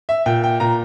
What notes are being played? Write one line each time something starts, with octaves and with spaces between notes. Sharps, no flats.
E5
A#2 G5
G5
A#2 A#5